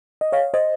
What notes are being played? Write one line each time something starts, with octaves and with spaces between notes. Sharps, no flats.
D#5
C#5 F5
C5 D#5